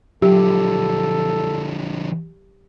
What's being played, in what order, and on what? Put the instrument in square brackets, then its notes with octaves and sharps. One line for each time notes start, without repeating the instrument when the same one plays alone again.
[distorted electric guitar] D3 F3 [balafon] F#3 [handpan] G4 [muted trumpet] A4